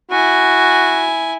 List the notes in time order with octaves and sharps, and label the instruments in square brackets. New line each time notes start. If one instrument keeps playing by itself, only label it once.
[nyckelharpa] E4 G#5 [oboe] F#4